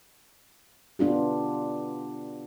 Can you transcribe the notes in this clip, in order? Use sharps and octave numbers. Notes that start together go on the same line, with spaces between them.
B3 D4 F4 G4